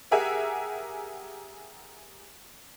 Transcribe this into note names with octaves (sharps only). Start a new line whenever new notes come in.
G4 G#4 A#4 E5 F#5 G#5